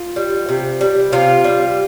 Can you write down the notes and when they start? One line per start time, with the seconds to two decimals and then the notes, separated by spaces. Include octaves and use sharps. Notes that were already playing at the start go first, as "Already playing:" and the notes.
Already playing: F4
0.16 G3
0.49 C3
0.81 G3
1.12 C3 F4
1.44 G3